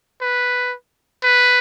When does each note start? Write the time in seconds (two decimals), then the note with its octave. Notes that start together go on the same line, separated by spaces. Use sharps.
0.21 B4
1.23 B4